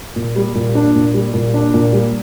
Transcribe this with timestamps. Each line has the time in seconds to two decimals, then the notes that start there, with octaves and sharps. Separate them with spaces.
0.16 A#2
0.36 G3
0.55 A#2
0.75 D4
0.95 A#2
1.14 G3
1.34 A#2
1.54 D4
1.74 A#2
1.92 G3